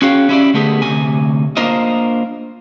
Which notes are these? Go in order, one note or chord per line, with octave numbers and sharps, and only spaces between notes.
C#4 F#4 G#4 C#5 F5 G5
C#4 E4 G4 D5
D3 A3 B3 G4 G#4
D2 C3 G#5
A#3 D4 F4 A#4 C5 D#5